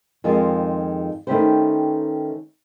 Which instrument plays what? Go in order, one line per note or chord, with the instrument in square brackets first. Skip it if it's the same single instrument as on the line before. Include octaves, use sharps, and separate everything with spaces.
[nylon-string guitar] F2 D#3 G#3 F4 G#4
D#3 A3 C#4 G4 B4 C5